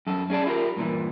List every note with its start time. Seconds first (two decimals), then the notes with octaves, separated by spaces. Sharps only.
0.07 F#2 A4
0.30 C#4 G#4 D5 A5
0.46 E4 F4 G4 A#4
0.76 G2 A#2 E3